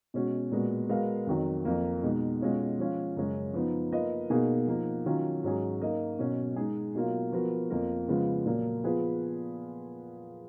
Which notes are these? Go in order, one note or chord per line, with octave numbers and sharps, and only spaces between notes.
B2 G#3 C#4 F#4
A#2 G#3 B3 F#4
G#3 B3 F#4 A#4 F5
F2 D#3 F#3
F2 F3 A#3
B2 G#3 D#4
B2 G#3 C#4 F4
F3 G#3 C#4 F4
F#2 C#3 G#3 C#4
F3 B3 D#4
A#3 F4 B4 D#5
B2 A#3 D#4 G#4
F3 A#3 D#4
D#3 F#3 C#4 F4
G#2 F#3 C#4 G#4
A#3 D#4 A#4 D#5
B2 F#3 C#4
G#3 D#4 G#4
B2 F#3 A#3 F4
F3 B3 F#4 A#4
F2 F3 A#3 F4 A#4
C#3 F3 G#3 B3 F4
A#2 F#3 A#3
F3 B3 F4 G#4 B4